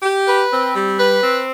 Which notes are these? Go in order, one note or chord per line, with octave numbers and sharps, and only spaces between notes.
G4
B4
C4
G3
B4
C4